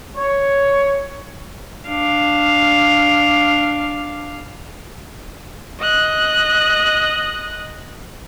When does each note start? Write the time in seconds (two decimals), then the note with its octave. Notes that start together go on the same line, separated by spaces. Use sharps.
0.16 C#5
1.87 D4 F5
5.81 D#5 F#6